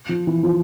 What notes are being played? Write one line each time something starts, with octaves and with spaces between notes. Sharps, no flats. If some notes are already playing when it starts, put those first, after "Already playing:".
F3
E3
F3